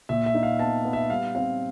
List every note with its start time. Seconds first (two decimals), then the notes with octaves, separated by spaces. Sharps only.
0.09 A#2 E5
0.26 E5
0.34 D#4
0.43 F5
0.59 B3 A5
0.85 B3
0.93 E5
1.10 G3 F5
1.35 C4 F5